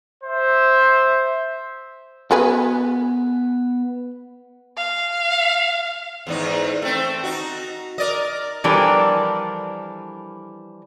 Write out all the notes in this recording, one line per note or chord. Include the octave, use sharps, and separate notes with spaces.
C5 E5
B3 F#4 G#4 B4
F5
E2 G#2 D#4
A3 C4
D#4 F#4
A#4 D5 D#5
E3 F3 G3 D4 A4 A#4